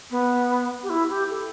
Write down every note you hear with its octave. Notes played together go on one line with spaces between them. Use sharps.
B3
G4
E4
G4
A4